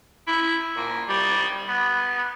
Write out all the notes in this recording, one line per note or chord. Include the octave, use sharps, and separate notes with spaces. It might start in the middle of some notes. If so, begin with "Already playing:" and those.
E4
A#2
G3
B3